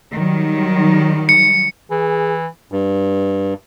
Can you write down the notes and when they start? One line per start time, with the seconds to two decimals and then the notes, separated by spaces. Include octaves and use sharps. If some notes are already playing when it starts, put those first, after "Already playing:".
0.12 D#3 F#3 G3
1.29 C#7
1.91 E3 G#4
2.72 G2